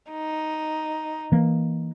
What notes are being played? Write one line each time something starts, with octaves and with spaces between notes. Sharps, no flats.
D#4
E3 A#3